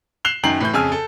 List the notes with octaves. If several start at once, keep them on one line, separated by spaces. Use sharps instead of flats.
F#6 C7 E7 F7 G7
F#2 D#3 G5 A#5 C7 F#7
A2 E3 G6
F2 C#3 G#5 E6 F6
A4